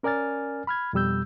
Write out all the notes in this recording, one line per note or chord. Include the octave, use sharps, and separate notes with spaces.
C#4 A#4 D5 G#5 F6 A6
B5 F6 G#6
F2 B2 G3 E6 G6